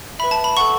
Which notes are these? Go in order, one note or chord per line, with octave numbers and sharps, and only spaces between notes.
B4 E5 B5
A5
B5
A4 F#5 C#6